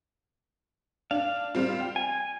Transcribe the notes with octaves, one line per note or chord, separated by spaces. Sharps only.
D4 F5
G3 C4 F4
G5
G#5